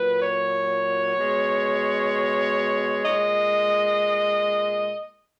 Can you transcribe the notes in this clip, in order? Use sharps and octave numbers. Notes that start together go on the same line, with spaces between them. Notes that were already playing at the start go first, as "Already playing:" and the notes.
Already playing: A#2 F#3 B4
C#5
B2 G#3
A#2 G#3 D#5